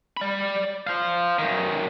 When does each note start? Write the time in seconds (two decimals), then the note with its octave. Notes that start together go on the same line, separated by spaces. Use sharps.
0.17 D5 B5
0.87 C5 F5
1.39 F#2 D#3